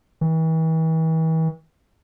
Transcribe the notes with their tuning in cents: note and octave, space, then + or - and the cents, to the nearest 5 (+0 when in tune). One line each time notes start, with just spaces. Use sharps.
E3 -40